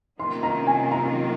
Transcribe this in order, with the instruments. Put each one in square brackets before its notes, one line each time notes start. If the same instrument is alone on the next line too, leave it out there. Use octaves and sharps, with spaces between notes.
[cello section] C3 D#3 F#3 A#3 F4 [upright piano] C6
[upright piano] A#5
G#5
A#5